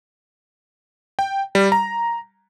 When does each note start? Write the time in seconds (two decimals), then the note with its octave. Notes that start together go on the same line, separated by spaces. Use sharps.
1.19 G5
1.55 G3
1.72 A#5